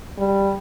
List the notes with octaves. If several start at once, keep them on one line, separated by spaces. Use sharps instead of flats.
G3